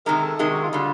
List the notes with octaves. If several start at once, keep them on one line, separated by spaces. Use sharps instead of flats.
C3 D#3 G#3 A#4
A4
C3 D#3 G#3
F#4
F4
D3 G3 F4